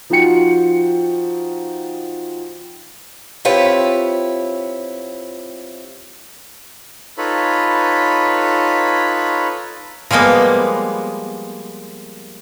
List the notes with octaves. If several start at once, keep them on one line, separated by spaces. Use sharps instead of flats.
F3 D#4 F4 F#4 G5 C#7
C4 E4 F4 G4 B4 C#5
D#4 F4 A4 B4 C#5 B5
F3 G3 G#3 A#3 B3